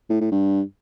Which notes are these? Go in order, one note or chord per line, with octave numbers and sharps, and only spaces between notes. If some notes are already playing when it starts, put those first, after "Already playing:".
A2
A2
G2